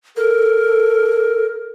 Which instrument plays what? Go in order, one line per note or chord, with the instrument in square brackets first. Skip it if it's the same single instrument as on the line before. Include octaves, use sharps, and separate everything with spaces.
[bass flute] A4 [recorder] A#4